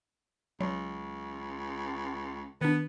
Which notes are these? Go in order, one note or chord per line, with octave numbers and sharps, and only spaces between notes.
C#2 F#3
D#3 B3 D4